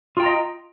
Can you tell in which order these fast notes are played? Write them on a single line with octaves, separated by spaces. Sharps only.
F4 G5 A#5 D#5